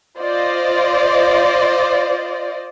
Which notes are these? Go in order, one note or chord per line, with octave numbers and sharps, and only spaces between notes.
F4 C5 D5 D#5